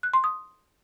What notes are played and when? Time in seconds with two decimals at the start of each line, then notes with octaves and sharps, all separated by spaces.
0.03 F#6
0.14 C6
0.24 D#6